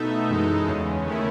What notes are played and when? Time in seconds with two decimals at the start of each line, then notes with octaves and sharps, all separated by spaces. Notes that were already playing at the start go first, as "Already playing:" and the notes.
Already playing: B2 A3 D#4 A4 E5
0.30 F#2 E3 G#3 D#4 A4
0.68 E2 C#3 G#3 C#4
1.08 D#3 A3 C#4 E4